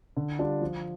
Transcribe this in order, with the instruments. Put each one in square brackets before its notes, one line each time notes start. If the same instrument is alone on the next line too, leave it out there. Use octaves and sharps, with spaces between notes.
[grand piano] D3
G3 D4 F4
F3